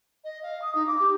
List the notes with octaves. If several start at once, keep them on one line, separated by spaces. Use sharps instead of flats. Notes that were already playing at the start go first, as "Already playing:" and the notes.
D#5
F5
D#6
D#4
D6
G4